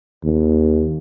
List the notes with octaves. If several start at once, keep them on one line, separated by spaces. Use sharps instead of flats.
D#2